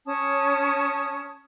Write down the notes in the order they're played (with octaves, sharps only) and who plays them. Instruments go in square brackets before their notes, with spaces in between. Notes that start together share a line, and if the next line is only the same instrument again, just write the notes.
[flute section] C#4 C#5 A5 D#6